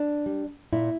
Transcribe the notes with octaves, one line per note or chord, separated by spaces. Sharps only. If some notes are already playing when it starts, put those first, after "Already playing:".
Already playing: D4
G3
A#2 E4